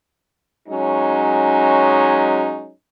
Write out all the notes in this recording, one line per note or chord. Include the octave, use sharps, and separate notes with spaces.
F#3 G#3 C#4 D#4